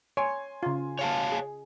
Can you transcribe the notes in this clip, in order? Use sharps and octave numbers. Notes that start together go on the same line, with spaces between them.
C#5 G#5 C6
C#3 F4
C#5 F5 A5
G#4